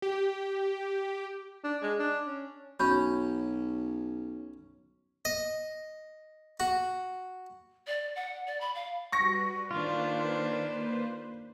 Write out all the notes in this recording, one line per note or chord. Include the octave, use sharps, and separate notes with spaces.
G4
D4
G#3
D4
C#4
B1 C#4 F#4 E5 B5 G6
D#5
F#4
D5
F#5
D5
B5
F5
G3 F#4 B4 C#6 A#6 C#7
D#3 A#3 D4 F4 B4 C5